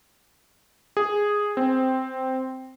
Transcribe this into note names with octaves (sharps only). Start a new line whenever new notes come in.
G#4
C4